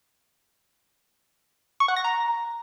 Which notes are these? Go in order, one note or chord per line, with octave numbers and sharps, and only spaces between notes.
C#6
F#5
A#6
A#5